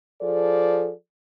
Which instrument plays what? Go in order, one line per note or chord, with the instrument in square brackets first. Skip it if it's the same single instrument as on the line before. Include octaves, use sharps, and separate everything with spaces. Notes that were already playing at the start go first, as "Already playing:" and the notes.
[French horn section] F3 G#4 A4 D5